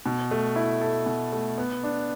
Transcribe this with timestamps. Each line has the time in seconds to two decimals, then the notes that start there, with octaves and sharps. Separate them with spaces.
0.06 B2
0.31 A3
0.56 E4
0.81 A4
1.06 B2
1.32 A3
1.58 B3
1.83 D4